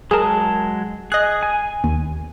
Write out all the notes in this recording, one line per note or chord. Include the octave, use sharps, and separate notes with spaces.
F#3 G#3 G#4 A#4 A5
G#4 D#5 F#6
G#5
D#2